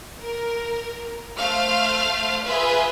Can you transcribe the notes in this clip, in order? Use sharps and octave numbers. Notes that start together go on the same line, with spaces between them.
A#4
A3 C5 F5 F6
F4 G#4 B4 E5